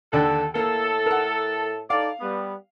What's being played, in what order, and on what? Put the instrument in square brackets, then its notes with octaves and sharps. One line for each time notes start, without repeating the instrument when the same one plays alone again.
[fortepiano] D#2 D3 D4 [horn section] A4
[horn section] A2 A4 [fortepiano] A#3
[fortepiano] A#4 F#5
[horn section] D#4 A4 D5 [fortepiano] F5
[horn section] G3 B3